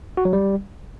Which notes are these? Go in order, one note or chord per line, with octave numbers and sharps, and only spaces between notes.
F#4
F#3
G3